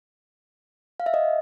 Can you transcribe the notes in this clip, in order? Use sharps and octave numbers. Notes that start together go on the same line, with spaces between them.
F5
E5
D#5